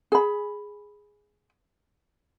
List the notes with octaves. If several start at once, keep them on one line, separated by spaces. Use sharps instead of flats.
G#4 B5